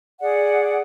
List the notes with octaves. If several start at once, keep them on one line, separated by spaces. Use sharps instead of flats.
G#4 D5 F#5